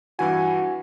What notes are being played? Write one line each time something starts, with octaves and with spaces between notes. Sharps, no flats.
G2 E3 F#4 G#5